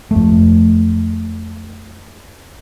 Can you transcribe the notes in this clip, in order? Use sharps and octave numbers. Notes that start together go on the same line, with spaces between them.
F2 A3